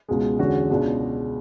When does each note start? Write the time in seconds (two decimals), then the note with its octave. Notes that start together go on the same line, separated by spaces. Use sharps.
0.08 C#2 B2 G#3
0.39 E2 D3 G#3 C#4 F#4
0.70 C#2 B2 G#3 D4